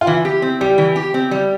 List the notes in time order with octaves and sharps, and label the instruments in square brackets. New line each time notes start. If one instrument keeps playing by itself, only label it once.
[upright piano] F4
[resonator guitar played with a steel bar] E3 [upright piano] E4
[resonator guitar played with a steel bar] G4
C4
[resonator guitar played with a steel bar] G3 [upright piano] G4
[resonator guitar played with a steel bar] E3
G4
C4
G3